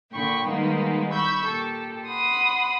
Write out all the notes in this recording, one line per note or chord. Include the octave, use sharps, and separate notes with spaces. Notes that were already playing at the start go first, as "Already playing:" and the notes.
A#2 D3 G5 B5 C#6
D#3 G3 G#3 A#3 B3 D#4
B5 C#6 E6 G6
A#2 G4 A4
F#5 B5 C6 D#6